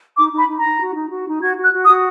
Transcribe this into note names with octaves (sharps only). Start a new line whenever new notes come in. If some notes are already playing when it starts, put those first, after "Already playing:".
D#4 D6
D#4 B5
D#4
A#5
D#4
F#4
D#4
F#4
D#4
F#4 G#6
F#4
F#6
F#4
D#6
F#4